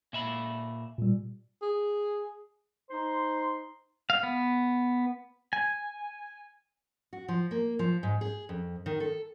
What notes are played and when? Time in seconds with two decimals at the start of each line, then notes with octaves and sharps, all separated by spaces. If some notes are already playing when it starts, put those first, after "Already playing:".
0.13 A#2 E5 B5
0.98 A#2 G3
1.62 G#4
2.90 D#4 C5 C6
4.10 F5
4.23 B3
5.53 G#5
7.13 F#4
7.28 F3
7.51 A#3
7.79 F3
8.03 G#2
8.21 G#4
8.49 F2
8.86 D#3
9.00 A4